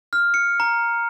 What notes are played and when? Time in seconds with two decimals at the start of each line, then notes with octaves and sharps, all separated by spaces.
0.13 F6
0.34 C#7
0.60 A#5